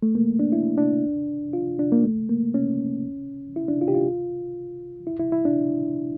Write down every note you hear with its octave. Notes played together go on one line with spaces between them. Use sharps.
A3
A#3
D4
E4
D4
F4
D4
A#3
A3
A#3
C#4
E4
D4
F4
G4
F4
E4
E4
E4
D4